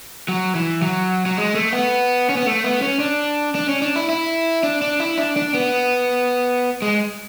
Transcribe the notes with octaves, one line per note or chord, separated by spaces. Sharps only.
F#3
E3
F#3
F#3
G#3
A3
B3
C#4
B3
A3
B3
C#4
D4
D4
C#4
D4
E4
E4
D4
D4
E4
D4
D4
B3
G#3